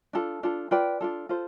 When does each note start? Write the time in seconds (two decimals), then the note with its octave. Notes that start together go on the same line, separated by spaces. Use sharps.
0.13 D4 F4 A4
0.43 D4 F4 A4
0.71 F4 B4 D5 G5
1.01 D4 F4 A4
1.29 F4 A4 C5